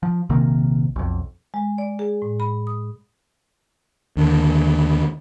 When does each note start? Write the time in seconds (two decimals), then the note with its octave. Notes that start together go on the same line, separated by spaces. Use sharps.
0.03 F3
0.29 A#1 C3 D#3 A#3
0.96 B1 F2
1.54 G#3
1.78 D5
1.99 G#4
2.22 A2
2.40 B5
2.67 D#6
4.17 D#2 D3